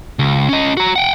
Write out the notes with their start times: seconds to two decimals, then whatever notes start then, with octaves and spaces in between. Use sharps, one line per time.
0.19 C#2
0.49 C#4 D#5
0.77 F#4 A#5
0.96 F#5 G5